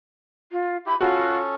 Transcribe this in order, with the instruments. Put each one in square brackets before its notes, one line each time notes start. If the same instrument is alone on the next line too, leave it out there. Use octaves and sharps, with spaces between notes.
[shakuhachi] F4
[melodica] E4 G4 [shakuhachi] B5
[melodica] C#4 A4 [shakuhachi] F4 [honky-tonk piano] F#4